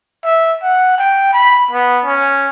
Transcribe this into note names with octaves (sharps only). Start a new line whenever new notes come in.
E5
F#5
G5
B5
B3
C#4